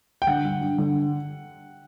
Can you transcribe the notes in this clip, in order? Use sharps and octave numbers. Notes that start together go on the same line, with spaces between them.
G5
D3 F#5
G2
G2
D3